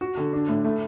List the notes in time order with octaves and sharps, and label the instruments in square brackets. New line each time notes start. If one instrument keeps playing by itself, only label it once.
[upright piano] F#4
D3
D4
A2
A3